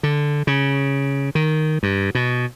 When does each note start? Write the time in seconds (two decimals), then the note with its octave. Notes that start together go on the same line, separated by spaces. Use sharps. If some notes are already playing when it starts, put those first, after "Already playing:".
0.03 D3
0.47 C#3
1.35 D#3
1.83 G2
2.15 B2